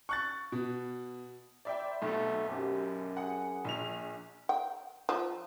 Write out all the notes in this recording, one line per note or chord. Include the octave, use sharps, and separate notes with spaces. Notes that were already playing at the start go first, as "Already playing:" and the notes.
C#6 F#6 A6
B2
C5 D5 E5 G5 B5
B1 A3 C4 F#4
F#2 C4 G4
G#4 F#5
A#1 F7
G5
F3